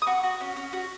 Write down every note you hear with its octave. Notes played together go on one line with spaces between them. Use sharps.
D#6
F#4 C#6
F#4
C#4
C#4
F#4